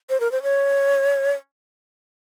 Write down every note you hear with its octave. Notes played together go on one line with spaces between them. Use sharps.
C5
A#4
C5
C#5